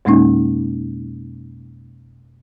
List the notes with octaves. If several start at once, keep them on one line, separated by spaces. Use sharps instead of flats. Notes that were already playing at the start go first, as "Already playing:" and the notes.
F2 B2 G#3 A#3 C#4 D#4